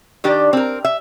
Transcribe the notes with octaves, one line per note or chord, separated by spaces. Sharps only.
D#3 D4 G4 D5
C4 A#4
E5